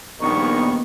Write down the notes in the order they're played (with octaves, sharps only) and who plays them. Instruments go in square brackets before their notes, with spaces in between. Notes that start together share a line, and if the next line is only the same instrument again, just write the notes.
[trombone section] A#1 D#3 D#4 [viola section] G3 A#3 B3 [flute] C#6